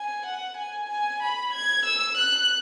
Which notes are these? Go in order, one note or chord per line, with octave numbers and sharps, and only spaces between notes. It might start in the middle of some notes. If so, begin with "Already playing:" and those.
Already playing: G#5
F#5
G#5
G#5
B5
G#6
E6
F#6